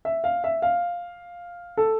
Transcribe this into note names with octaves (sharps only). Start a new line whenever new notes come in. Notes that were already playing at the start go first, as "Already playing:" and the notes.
E5
F5
E5
F5
A4